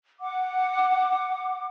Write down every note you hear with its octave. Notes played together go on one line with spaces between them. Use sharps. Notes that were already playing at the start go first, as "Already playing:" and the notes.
F#5 D6